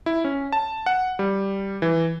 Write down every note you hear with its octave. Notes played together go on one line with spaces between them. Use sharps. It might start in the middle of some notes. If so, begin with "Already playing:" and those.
E4
C#4
A5
F#5
G3
E3